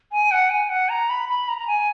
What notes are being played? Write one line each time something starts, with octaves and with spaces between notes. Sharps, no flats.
G#5
F#5
G#5
F#5
A#5
B5
B5
A#5
A#5
G#5